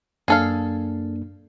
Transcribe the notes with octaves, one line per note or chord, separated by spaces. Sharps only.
F#2 A#3 D4 G#4 A4 F5